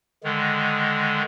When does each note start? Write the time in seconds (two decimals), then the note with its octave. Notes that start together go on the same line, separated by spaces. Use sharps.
0.24 D3 D#3 G#3